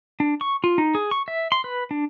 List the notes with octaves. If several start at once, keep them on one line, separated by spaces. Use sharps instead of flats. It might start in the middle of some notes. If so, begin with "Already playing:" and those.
D4
C#6
F4
D#4
G#4
C#6
E5
C6
B4
D4